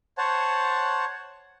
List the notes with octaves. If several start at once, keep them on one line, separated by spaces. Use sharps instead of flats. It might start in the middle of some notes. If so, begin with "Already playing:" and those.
C5 C#5 F#5 A5